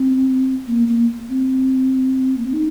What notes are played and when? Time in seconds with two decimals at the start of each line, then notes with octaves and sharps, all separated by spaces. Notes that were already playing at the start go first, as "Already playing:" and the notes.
Already playing: C4
0.67 A#3
0.87 A#3
1.29 C4
2.37 A#3
2.45 C4
2.53 D#4